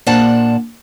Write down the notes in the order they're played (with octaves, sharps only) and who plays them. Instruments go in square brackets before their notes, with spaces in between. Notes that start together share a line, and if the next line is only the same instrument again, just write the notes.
[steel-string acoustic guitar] A#2 D4 C5 D5 F#5 A5